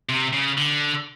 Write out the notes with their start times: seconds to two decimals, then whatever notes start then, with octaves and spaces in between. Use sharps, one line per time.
0.09 C3
0.33 C#3
0.58 D3